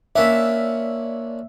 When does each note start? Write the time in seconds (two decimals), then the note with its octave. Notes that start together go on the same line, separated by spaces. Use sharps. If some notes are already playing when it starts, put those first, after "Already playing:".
0.16 A#2 C#4 D4 E5